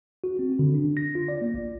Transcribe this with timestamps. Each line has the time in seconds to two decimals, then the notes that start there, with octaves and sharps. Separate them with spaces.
0.24 F#4
0.39 C4
0.59 D3
0.75 D4
0.97 A#6
1.15 F4
1.28 D5
1.41 A#3
1.54 A#1